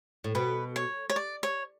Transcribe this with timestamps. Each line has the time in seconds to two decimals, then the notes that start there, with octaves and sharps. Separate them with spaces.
0.24 A2
0.35 B2 B4
0.76 C#5
1.10 C#5
1.16 D5
1.43 C#5